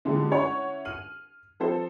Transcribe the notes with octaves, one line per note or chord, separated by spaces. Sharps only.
A#2 D3 E3 G3 G#3 C#4
C#4 E4 C#5 F#5 C#6
F6 D#7 F#7
F3 C4 A4 C5